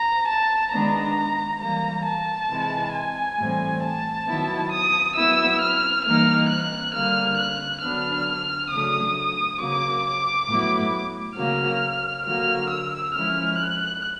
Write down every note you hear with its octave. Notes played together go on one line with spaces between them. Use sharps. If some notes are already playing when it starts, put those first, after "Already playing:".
Already playing: A#5
A5
D#3 G#3 B3 D4 A#5
E3 G3 A#3 A#5
A5
C3 E3 G#3
G#5
A2 E3 G3 C4
A5
D#3 F#3 B3 E4
D#6
F#3 B3 E4 E6
F6
E3 G3 A#3 D#4 F6
F#6
D3 G3 A#3 F6
F#6
D3 F#3 B3 D4 F6
C#3 F#3 A3 D4 D#6
C#3 F#3 A#3 D6
D6
A2 F#3 B3 E4
C#3 F#3 A#3 F6
D3 F#3 A#3 F6
E6
F3 G#3 C#4 E4 F6
F#6